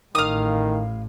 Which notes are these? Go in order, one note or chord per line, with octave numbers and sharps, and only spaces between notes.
A1 A2 D#3 F5 D#6